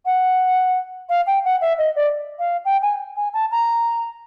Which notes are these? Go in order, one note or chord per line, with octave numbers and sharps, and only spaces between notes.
F#5
F5
G5
F#5
E5
D#5
D5
F5
G5
G#5
G#5
A5
A#5